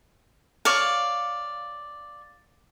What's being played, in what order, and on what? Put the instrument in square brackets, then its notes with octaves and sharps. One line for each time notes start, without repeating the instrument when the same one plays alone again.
[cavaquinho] C#5 D5 F5